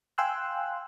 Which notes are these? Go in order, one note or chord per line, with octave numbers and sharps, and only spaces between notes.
F5 G5 G#5 C6 E6 F#6